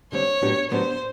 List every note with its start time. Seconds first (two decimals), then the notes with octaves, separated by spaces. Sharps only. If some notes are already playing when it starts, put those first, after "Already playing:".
0.12 D3 G3 C4 C#5
0.41 A2 F#3 B3 D4 G4
0.70 A2 F#3 B3 D4 G4 C5